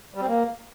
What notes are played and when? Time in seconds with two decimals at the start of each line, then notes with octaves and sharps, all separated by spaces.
0.14 G3
0.21 C4
0.28 A#3